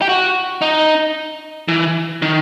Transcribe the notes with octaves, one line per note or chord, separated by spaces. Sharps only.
G4
F#4
D#4
E3
D#3